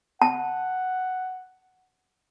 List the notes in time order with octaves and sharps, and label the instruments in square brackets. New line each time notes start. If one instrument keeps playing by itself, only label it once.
[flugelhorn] F#5 [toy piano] A5